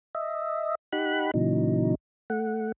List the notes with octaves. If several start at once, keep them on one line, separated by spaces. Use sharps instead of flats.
D#5 E5
D#4 G4 F#5 B5 F#6
A#2 C#3 E3 F#3 D#4
A3 F#5